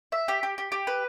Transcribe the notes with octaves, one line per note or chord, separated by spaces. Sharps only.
E5
G4
G4
G4
G4
B4